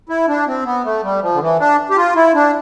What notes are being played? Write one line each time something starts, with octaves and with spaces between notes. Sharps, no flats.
E4
D4
C4
B3
A3
G3
F3
D3
E3
D4
G4
F4
E4
D4